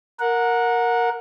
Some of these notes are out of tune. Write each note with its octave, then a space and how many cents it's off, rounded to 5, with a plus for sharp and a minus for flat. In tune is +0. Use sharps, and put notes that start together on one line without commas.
A#4 +0 F#5 -20